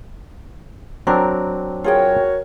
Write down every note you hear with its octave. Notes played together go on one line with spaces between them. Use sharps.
F#3 C4 D4 A#4
F4 F#4 G#4 A#4 C#5 G5